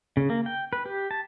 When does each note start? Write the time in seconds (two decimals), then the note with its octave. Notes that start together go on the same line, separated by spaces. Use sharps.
0.17 C#3
0.30 A#3
0.46 G5
0.73 B4
0.86 G4
1.11 A5